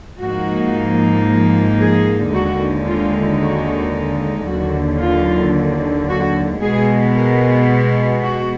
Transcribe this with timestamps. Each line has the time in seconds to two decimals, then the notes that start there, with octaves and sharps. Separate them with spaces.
0.19 G#2 F3 A#3 D#4 F#4
1.80 G#4
2.34 D#2 D3 G#3 D#4 F#4
2.88 F4
3.41 F#4
4.48 D#2 D3 F#3 F#4
5.02 F4
6.09 F#4
6.63 B2 G#3 B3 G#4
7.16 A#4
8.23 F#4